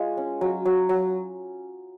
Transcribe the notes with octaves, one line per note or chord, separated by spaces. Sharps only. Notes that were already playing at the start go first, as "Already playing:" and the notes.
Already playing: G#3 F4 C#5
C#4
F#3
F#3
F#3